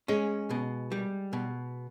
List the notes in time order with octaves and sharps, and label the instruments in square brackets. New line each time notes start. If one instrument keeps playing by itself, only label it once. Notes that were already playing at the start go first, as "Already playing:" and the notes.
[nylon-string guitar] G#3 [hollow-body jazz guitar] C#4
[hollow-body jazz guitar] B2
G3
B2